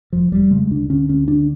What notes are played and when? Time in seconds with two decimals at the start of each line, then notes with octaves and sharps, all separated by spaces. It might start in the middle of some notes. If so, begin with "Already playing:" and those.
0.13 F1 F3
0.32 F1 G3
0.51 C#3 G#3
0.71 D2 D4
0.90 D3 C#4
1.09 D2 C#4
1.28 D3 D4